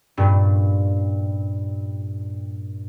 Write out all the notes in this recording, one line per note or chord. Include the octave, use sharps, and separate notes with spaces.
G2 A#2